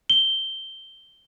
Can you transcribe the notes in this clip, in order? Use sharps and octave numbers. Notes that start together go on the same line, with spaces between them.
G7